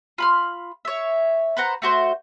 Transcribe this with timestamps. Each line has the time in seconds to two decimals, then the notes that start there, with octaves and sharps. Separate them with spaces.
0.18 F4 B5 F6
0.85 C#5 E5
1.57 B4 C5 F#5 A#5
1.82 A3 F#4 C5